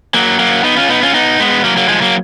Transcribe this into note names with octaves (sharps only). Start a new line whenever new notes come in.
F#3 A#3
F#3 A#3
B3 D#4
C#4 F4
B3 D#4
C#4 F4
B3 D#4
G#3 B3
F#3 A#3
F#3 A#3
F3 G#3
F#3 A#3